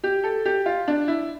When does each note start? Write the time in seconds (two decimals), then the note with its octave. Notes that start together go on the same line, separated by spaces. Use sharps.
0.04 G4
0.24 A4
0.45 G4
0.66 F4
0.88 D4
1.08 E4